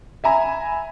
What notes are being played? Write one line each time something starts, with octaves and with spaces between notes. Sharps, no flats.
E5 G#5 A#5 B5